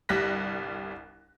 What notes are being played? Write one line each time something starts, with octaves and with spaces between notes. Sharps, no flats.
G1 C2 G3 F#6 A#6 B6